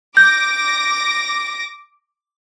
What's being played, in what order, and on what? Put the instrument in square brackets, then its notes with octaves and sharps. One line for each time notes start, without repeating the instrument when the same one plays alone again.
[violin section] D6 A#6 [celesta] G6